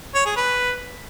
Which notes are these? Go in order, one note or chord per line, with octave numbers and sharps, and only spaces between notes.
C#5
G#4
B4